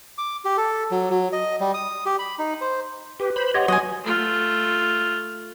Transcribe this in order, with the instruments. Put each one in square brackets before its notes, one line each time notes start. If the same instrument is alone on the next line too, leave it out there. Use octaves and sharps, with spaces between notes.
[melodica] D6
G4
A4
F#3
F#3
D#5
G3
D#6
G4
B5
D#4
C5
[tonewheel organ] G4 [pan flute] B4
[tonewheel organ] C5 B5
[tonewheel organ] G4 C#5 D#5 [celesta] F#5 C6 G#6
[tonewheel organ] F#3 F#4 [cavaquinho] D#5 G#5
[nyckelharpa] A3 F4